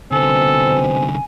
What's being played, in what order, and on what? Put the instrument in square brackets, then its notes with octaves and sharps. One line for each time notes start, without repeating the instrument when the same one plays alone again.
[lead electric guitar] C2 D3 [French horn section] B2 C4 C5 [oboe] A4 [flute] G#5